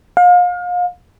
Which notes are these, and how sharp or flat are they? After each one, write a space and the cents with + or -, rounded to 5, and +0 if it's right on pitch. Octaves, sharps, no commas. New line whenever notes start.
F5 +35